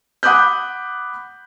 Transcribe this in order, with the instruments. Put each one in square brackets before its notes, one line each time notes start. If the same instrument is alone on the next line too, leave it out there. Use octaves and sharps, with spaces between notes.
[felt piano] F#5 B5 D6 D#6 F#6 G6